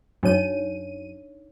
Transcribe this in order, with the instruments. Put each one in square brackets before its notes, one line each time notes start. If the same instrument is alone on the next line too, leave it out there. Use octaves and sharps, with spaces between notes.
[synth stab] F#2 D#7 [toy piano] D4 D#4 C#5